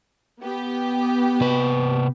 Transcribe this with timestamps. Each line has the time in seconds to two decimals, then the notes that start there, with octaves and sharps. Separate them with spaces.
0.43 B3 G4
1.41 C3 B4